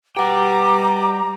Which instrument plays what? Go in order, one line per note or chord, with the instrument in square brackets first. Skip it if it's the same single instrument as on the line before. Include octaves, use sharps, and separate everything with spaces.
[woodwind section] B2 D6 [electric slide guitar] G3 G5 [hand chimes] G4 F#5 [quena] A#5